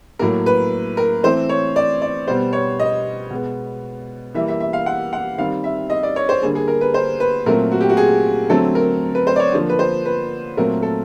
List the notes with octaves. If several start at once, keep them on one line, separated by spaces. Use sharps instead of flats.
A2 F#3 A#3 A#4
B4
A#4
E3 A3 C4 C5
C#5
D5
D5
B2 G3 B3 C5
C#5
D#5
B2 G#3 B3
E3 G3 A#3 E5
E5
E5
F5
F#5
F#5
D#3 G3 C4 F5
E5
D#5
D5
C#5
C5
D3 G3 A#3 G#4
G#4
A#4
B4
C5
B4
A#2 F#3 A3 C4 A#4
F#4
G4
F#4
G#4
D3 F#3 A3 C4 A4
A#4
B4
C5
D5
C#5
D3 F3 A#3
B4
C5
B4
A#2 F#3 A3 C4 A#4
A4